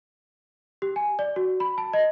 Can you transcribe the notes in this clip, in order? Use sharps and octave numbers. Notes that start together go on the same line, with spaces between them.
G4
G#5
D5
F#4
B5
A5
D#5